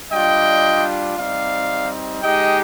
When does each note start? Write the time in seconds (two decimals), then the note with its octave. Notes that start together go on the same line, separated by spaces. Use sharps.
0.11 G3 D4 F4 D#5 G5
1.17 G3 C4 D#4 D5 F5
2.22 G#3 D#4 G4 D#5 G5